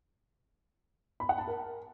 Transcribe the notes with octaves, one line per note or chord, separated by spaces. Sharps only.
B5
F#5
A5
A#4